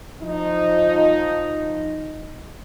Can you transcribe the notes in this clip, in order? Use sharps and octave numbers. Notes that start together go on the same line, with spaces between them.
F3 D#4